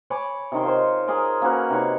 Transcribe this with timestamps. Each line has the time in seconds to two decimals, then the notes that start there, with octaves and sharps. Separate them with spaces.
0.10 C#5 G#5 B5 D6
0.52 C3 D#3 C6
0.64 F4 A#4 C5 C#5
1.07 G#4 A#4 C6 D6
1.42 A#3 C#4 F#4 B4
1.70 C3 D#4 B4 C#5